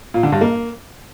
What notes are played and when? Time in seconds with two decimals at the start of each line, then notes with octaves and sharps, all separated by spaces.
0.14 A#2
0.23 D3
0.32 G2
0.41 A#3